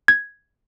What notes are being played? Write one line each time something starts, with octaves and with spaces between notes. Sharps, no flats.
G#6